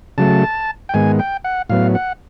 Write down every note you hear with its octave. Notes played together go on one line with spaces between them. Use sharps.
C#3 F#3 A3 A5
G5
G#2 D#3 G#3 B3 G#5
G5
F#5
A2 F#3 B3 F5
F#5